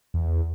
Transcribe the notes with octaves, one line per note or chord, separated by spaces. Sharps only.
E2